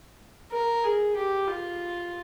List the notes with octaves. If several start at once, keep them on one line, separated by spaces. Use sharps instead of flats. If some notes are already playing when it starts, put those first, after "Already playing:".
A#4
G#4
G4
F4